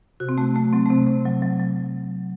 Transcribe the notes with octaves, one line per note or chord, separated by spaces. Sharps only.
C3 F#4
C4
C3 A3
F#3 A3
F#3 C4
A3
C3 C4
C3
F#3
F#3
F#3